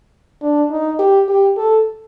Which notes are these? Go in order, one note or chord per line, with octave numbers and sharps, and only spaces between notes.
D4
D#4
G4
G4
A4